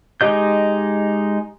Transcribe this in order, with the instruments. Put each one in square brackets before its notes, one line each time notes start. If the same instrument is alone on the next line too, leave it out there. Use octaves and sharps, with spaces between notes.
[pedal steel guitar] G#3 D#4 G4 D#5 G6